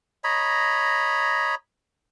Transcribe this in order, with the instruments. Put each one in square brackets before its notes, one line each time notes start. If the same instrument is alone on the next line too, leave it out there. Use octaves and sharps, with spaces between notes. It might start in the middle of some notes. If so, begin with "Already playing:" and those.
[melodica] C#5 D#5 A#5 B5